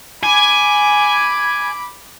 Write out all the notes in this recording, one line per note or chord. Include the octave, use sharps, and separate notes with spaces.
G#5 B5 D6